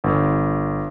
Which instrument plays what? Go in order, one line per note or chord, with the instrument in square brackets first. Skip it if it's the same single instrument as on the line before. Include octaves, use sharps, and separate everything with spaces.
[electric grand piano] G1